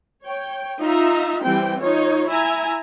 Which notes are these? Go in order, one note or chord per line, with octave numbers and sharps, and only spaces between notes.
C#5 G5
D#4 F4 E5 A#5
E3 G3 C4 G5
D#4 F4 C#5
E4 E5 G#5 A#5